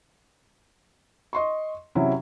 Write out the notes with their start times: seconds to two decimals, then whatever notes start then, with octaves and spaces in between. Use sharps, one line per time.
1.33 D#5 C6 C#6
1.95 C3 F#3 C#4 E4